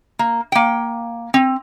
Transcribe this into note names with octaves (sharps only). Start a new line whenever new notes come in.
A#3
A#3 G5
C4